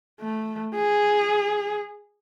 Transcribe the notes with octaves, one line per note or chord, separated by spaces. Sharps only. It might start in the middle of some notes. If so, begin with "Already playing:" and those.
A3
G#4